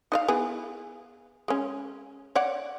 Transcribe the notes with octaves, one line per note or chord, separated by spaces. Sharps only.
D#4 D#5 F5
B3 E4 G#4
G#3 C#4
C#5 D5 F#5